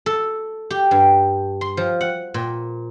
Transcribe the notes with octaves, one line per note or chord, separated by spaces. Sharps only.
A4
G4
G2
C6
F3
F#5
A#2